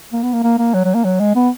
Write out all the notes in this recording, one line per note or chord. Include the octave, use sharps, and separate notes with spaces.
A#3
B3
A#3
A#3
A#3
F#3
F#3
A#3
F#3
G#3
B3